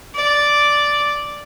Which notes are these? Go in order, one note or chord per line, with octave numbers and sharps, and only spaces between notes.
D5